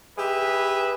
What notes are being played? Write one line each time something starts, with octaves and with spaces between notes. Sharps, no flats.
G4 G#4 B4 E5